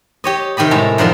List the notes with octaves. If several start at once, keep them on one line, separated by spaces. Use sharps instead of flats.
G4 C#5 D#5
C3 D#3 G4 D#5 B5
A2 G#3 A4 A#5
F#2 D#3 F3 D4 A#4 C6